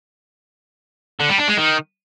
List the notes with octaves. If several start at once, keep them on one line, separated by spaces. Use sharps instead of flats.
D3
G3
D4
G#3
D#3